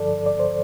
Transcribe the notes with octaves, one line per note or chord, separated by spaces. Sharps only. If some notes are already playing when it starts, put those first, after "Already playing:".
Already playing: G2 D3 F3 A4 D5
D5
C5